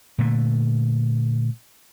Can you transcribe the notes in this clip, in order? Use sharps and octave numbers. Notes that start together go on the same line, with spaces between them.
A#2 D3 A3